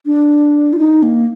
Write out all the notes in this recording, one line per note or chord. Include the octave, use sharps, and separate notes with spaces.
D4
F4
D#4
A#3